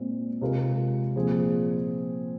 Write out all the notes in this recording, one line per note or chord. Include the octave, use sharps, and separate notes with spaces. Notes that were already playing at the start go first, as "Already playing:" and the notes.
Already playing: A#2 G#3 C4
C3 G#3 F4 A#4
A#2 F3 C4 G#4